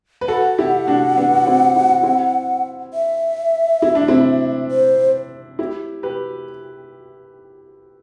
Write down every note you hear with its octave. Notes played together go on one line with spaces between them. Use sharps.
B4
F#4 A4 F#5
E4 G4
D4 F#4
B3 D4
F#4
C4 E4
E4
F#4
C4 E4
E5
E4
D4
C4 E4
C5
E4 G4
G4 B4